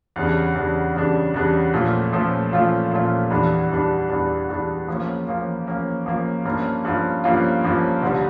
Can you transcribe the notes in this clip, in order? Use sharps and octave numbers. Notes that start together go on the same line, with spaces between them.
E2 C#3 G3 D4
E2 C#3 G3 D4
E2 C#3 G3 D4
E2 C#3 G3 D4
A#2 F3 A3 C#4 F4
A#2 F3 A3 C#4 F4
A#2 F3 A3 C#4 F4
A#2 F3 A3 C#4 F4
E2 E3 G3 D4
E2 E3 G3 D4
E2 E3 G3 D4
E2 E3 G3 D4
F3 A#3 C#4
F3 A#3 C#4
F3 A#3 C#4
F3 A#3 C#4
G2 F3 A#3 C#4 F4
G2 F3 A#3 C#4 F4
G2 F3 A#3 C#4 F4
G2 F3 A#3 C#4 F4
D2 D3 G3